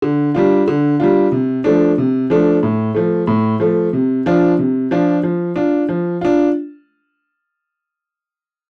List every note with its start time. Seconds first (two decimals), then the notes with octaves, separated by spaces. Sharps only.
0.02 D3
0.34 G3 D4 F4
0.68 D3
1.00 G3 D4 F4
1.32 C3
1.64 F3 A3 D4
1.98 C3
2.30 F3 A3 D4
2.63 A2
2.95 F3 A3
3.27 A2
3.60 F3 A3
3.93 C3
4.26 F3 D4 F4
4.59 C3
4.91 F3 D4 F4
5.23 F3
5.56 D4 F4
5.89 F3
6.21 D4 F4